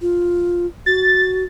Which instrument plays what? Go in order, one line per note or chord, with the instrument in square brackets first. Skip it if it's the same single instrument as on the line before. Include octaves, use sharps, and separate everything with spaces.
[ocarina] F4
[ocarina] F#4 [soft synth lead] A6